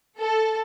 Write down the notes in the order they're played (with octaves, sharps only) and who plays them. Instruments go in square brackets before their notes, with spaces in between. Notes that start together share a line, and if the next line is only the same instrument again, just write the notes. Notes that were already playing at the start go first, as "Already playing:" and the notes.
[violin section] A4